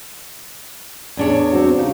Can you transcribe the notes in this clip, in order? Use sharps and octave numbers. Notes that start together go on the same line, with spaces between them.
E2 D4 C#5
C4 F#4
C#3 D#4 G4